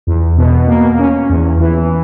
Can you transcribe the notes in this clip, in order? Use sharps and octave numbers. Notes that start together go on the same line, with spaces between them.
E2
B2
A#3
C#4
E2
E3